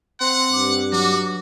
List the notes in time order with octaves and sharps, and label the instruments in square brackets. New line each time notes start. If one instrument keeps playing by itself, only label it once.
[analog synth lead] C4 [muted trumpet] F#5 [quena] C6
[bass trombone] G2 [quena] D6
[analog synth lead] F#3 [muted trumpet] F#4